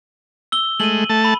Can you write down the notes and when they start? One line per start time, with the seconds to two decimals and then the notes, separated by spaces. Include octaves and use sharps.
0.52 E6 G7
0.80 G#3 A3 D#7 F#7
1.10 A3 A5
1.25 B5